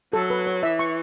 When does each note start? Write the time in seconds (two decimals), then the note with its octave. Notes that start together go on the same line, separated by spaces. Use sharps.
0.13 F#3 A4
0.30 B4
0.47 C#5
0.63 E3 E5
0.79 C#6